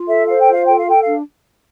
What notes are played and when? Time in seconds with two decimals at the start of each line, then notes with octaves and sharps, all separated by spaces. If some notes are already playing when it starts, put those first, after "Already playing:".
Already playing: F4
0.08 A4 E5
0.28 C5 F5
0.41 G5
0.48 F4
0.53 F5
0.66 A4 G5
0.78 F5
0.87 A4 G5
1.04 D4 F5